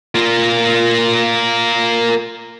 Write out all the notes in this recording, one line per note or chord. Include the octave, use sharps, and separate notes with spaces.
A#3 F4